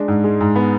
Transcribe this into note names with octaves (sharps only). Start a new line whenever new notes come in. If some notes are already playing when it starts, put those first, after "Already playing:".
Already playing: G#3 D4
G#2
G#3
G#2
B3